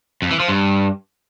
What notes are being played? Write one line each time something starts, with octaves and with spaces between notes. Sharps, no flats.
F2
E3
F3
G2